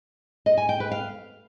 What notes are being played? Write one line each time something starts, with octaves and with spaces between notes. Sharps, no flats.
D#5
G#5
G5
B4
F5